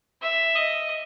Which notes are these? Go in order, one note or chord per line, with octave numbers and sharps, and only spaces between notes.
E5
D#5